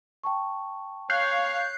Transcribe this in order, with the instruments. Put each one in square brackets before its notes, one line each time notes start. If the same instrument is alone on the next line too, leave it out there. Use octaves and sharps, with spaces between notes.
[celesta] G5 A5 C#6
[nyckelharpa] C#5 [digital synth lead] F5 [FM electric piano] F#6 G6 C7